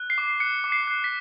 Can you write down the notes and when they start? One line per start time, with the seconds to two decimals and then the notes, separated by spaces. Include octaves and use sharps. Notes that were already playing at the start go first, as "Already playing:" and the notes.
Already playing: F#6
0.10 C7
0.18 D6
0.40 F#6 C#7
0.64 D6
0.72 C7
0.87 F#6
1.04 B6